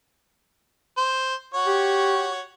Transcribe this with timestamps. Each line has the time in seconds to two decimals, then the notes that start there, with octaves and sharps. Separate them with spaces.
0.97 C5
1.54 F#4 C#5
1.66 G4